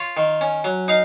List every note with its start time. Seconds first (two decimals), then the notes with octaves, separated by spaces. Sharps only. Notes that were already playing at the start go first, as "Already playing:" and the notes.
Already playing: F4 C#5
0.17 D#3
0.41 C#4
0.64 F#3
0.88 D#4 F5